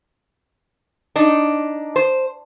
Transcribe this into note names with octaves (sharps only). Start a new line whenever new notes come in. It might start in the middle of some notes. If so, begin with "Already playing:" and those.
D4 D#4
C5